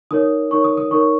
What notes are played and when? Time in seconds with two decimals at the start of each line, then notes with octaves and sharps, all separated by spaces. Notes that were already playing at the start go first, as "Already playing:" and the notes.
0.11 D#4 A#4 C#5 D#6
0.51 D#4 A#4 C#5 C#6
0.64 D#6
0.77 D#6
0.91 D#4 A#4 C#5 C#6